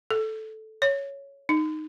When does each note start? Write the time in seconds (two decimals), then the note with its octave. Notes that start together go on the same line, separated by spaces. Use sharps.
0.11 A4
0.82 C#5
1.49 D#4